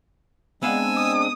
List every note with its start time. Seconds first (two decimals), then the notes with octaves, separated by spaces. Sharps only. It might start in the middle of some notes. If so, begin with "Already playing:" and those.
0.63 G#3 B3 C4 D4 F5 F#5 G#5 E6
0.97 D#6